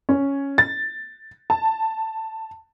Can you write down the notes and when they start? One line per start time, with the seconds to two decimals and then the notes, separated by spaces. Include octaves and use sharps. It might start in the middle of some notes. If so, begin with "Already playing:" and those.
0.09 C#4
0.58 A6
1.50 A5